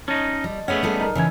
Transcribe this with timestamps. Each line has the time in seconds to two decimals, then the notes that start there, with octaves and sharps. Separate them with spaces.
0.08 C#4 D#4 D#5 A5 C#6
0.44 G3
0.68 A3 B3 C#4 G#4 C#5 F#5
0.83 G3 G#4 A4
0.99 D#4 A#4
1.15 C#3 E3 C#4 E5 G#5